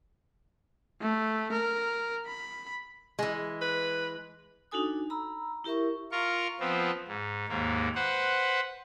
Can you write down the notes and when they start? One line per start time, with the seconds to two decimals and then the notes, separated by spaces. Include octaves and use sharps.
1.01 A3
1.52 A#4
2.27 B5
3.19 E3 G#3
3.62 B4
4.71 D4 D#4 F#4 A4 G#5 D#6
5.10 A#5 B5 E6
5.64 E4 G4 A#4 E5 C#6
6.12 F4 A#4 C#6
6.60 F3 B3 C4
7.08 G#2
7.49 D#2 G#2 A#3
7.95 B4 C5 F#5